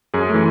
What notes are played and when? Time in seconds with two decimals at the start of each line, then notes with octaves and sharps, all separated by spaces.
0.14 F#2 G#4
0.29 A3
0.34 E3